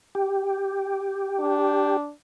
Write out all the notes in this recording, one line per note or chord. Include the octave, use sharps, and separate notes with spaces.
G4
D4